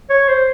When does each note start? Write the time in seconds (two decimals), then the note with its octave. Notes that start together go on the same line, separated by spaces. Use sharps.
0.10 C#5
0.28 C5